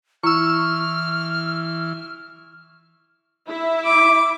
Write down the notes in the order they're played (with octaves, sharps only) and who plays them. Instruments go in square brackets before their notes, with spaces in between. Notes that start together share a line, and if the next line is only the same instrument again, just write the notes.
[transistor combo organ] E3 [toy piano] E4 [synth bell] C#6 E6 [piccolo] F6
[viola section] E4 E5
[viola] D6